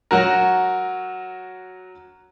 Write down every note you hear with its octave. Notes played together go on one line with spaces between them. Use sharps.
F#3 F#4 A#4